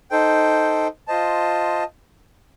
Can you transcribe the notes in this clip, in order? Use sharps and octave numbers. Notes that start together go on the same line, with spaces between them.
D#4 A4 C5 G5
F4 C5 D#5 A5